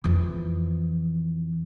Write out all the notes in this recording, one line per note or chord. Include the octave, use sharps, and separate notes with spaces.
F2 E3